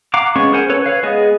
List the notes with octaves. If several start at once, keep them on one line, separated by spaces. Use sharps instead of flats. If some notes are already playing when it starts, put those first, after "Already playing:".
F5 F#5 A#5 D6
G#3 B3 C#4 C#6
G#4 A#4 C5 F#5 G#5
C#4 A4 B4 C#5
B4 C#5 F5
G#3 B3 G#4 D#5